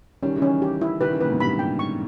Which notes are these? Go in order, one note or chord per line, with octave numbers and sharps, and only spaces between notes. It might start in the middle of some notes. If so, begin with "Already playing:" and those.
D#3 G3 C#4
C#3 E3
C#4
G4
E4
D#3 G3 B4
C#3 E3
A#2 C#3 B4
G#2 B2
G2 A#2 B5
G5
C#6